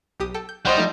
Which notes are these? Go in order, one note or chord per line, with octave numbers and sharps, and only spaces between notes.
B1 G4 D#6
A4 G5
G6
A#1 G3 F#4 C5 D#5
F3 A3 D#4